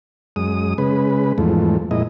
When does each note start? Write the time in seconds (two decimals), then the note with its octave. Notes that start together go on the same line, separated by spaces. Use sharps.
0.36 F#2 G#3 D#6
0.78 C#3 G#3 B4
1.38 E2 G#2 F3 A3
1.91 F2 A#2 G#3 E4 D#5